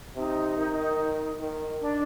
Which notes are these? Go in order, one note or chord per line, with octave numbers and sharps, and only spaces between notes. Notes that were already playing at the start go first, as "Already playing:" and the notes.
C3 D#4
D#3
D#3
D4